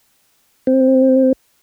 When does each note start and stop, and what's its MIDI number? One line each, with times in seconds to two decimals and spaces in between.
0.67 1.33 60